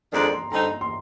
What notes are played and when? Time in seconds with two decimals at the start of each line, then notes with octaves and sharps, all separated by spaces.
0.13 F2 D#3 G#3 D4 A#5
0.33 C6
0.52 D3 G3 C4 D#4 A#5
0.71 A#5
0.81 C6